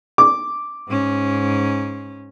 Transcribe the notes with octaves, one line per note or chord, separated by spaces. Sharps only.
D6
G#2 C#4